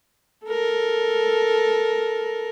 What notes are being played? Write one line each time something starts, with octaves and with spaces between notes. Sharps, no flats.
A4 A#4